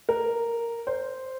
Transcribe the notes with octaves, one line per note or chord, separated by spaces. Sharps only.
A#4
C5